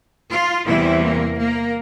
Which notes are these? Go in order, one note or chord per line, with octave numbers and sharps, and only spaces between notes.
F4
E2 C3 E3 G3 E4
A#3
A#3